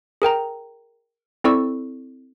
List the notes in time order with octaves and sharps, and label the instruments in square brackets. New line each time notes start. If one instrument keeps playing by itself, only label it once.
[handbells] G#4 A#4 G5 A#5
C4 E4 A4 D5 C#6 E6